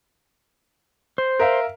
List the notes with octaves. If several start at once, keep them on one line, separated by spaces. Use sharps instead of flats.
C5
A#4 E5 F5